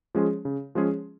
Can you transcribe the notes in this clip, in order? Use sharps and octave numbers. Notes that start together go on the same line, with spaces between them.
F3 G#3 C#4 G#4
C#3
F3 G#3 C#4 G#4